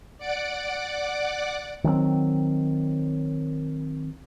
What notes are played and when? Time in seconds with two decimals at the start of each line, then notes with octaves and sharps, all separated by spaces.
0.18 D5 F#5 D6
1.84 D#3 F#3 A3 C4